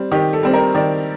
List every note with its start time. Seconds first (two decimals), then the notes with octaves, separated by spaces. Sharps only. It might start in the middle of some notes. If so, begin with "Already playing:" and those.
Already playing: G3 C4
0.11 D#3 G4
0.33 A4
0.43 G3 C4
0.53 A#4
0.75 D#3 D5